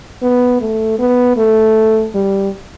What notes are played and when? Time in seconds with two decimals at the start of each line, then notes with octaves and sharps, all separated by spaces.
0.22 B3
0.60 A3
0.99 B3
1.37 A3
2.15 G3